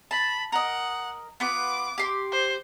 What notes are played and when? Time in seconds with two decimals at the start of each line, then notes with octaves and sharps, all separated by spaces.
0.11 A5 B5
0.52 A#4 D#5 F#5
1.40 B3 F4 B4 D6
1.98 G4 C6
2.32 C5